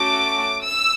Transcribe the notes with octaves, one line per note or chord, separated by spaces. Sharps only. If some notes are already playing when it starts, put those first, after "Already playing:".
Already playing: A3 C#4 F#4 A4 D6
E6